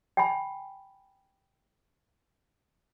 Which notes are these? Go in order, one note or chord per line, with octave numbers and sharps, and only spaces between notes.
G5 G#5 B5